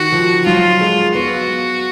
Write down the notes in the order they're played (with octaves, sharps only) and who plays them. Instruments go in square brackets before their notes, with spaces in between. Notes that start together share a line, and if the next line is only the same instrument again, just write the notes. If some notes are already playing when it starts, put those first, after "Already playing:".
Already playing: [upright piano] D#3 [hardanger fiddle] F#4
[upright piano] F3
[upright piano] F#3 [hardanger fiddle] F4
[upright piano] G#3
[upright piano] B3 [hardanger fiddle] F#4